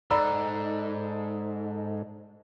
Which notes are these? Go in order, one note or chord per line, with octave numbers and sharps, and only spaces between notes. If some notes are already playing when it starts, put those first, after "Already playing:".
G#2 D#4 A4 D5 A#5 B5 E6